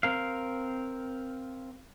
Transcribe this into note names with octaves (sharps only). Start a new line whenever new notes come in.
C4 A#4 F5